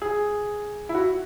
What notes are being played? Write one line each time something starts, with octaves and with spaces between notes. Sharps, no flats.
G#4
E4
F#4